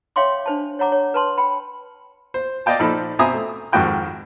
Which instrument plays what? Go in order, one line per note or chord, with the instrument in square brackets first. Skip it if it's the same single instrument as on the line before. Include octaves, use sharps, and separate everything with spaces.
[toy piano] C#5 E5 F5 G5 C6 D6
D4 C5 A5
C#5 F#5 A#5 D6
C#5
B4 A5 C6
G5 B5
[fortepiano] C5
D5 D#5 F5 G5 A5
A#2 F3 D#4 A4 B5
B2 C4 E5 G#5 A#5 D#6
A3
F2 G#2 D#3 F#4 G5 F#6